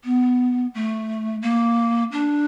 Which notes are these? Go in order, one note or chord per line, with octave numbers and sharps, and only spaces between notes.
B3
A3
A#3
D4